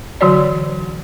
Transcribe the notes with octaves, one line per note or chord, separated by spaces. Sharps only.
D3 E3 F#3 F#4 C#5 D5